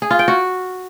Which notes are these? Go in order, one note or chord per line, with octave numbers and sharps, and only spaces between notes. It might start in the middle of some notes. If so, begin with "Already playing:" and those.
G#4
F4
G5
F#4